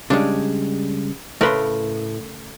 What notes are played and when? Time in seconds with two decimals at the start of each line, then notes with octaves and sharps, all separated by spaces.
0.10 C#3 G3 G#3 D4
1.41 A2 C#3 A3 A#4 B4 C6